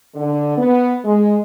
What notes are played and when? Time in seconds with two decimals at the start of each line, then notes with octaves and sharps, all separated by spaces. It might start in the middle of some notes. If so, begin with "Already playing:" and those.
0.14 D3
0.57 B3
1.05 G#3